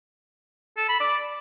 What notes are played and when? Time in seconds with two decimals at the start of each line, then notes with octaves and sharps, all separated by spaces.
0.77 A4
0.89 B5
1.00 D5